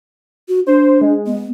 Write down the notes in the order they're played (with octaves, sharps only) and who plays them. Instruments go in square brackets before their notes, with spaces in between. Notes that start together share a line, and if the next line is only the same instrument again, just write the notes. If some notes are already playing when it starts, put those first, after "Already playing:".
[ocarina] F#4
[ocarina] D4 [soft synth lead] C5
[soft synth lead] G#3
[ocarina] B3